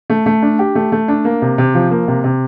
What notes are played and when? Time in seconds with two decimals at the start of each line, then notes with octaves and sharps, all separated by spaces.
0.10 A3
0.26 A3
0.42 D4
0.59 G4
0.75 A3
0.92 A3
1.08 D4
1.25 A#3
1.42 C3
1.58 C3
1.74 F3
1.91 A#3
2.08 C3
2.24 C3